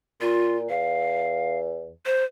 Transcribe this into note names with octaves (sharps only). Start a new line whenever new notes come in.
A#2 F4
E2 F5
C5